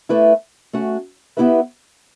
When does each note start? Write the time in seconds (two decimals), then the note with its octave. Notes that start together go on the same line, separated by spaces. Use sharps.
0.09 A3 E4 B4 D5
0.73 A3 C#4 F#4
1.37 B3 E4 G4 B4 E5